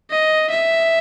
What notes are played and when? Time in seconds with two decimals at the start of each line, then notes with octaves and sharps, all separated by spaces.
0.11 D#5
0.50 E5